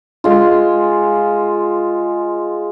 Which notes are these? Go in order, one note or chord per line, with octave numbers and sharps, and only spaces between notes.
G#3 F4